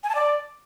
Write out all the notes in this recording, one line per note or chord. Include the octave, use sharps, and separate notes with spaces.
G#5
A5
D5